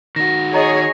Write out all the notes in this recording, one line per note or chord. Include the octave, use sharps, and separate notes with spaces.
D#3 F#4 A#6
G#4 C#5 D#5 A#5